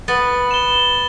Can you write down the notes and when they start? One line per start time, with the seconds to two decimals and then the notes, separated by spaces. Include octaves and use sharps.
0.08 B3 A6
0.51 E7 G7